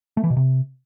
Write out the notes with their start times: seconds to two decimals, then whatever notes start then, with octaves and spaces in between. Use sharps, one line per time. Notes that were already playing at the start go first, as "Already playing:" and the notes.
0.17 A3
0.24 E3
0.30 B2
0.37 C3